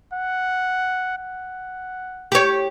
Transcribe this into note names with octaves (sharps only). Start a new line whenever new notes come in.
F#5
F#5
G4 C#5